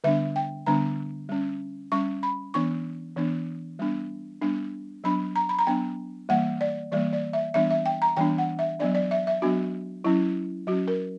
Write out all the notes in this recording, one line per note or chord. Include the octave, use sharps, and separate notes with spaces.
D3 G3 B3 D4 E5
G5
D3 G3 B3 D4 A#5
G3 C#4
G3 C#4 C#6
B5
E3 B3 D4 C#6
E3 B3 D4
G3 B3 D4
G3 B3 D4
F#3 B3 D4 B5
A#5
B5
A#5
F#3 B3 D4 G5
E3 G3 A#3 F#5
D5
E3 G3 A#3 D5
D5
E5
E3 G3 B3 D4 E5
E5
G5
A#5
E3 G3 B3 D4 G5
F#5
E5
F#3 B3 D4 D5
D5
E5
E5
F#3 B3 D4 F#4
F#3 C#4 E4
F#3 C#4 F#4
A#4